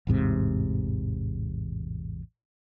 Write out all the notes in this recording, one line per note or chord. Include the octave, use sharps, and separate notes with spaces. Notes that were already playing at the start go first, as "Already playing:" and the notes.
A1 E2 G#2 C3